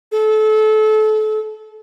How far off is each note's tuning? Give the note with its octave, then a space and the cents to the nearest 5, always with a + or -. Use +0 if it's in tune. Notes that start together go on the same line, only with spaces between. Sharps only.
A4 -30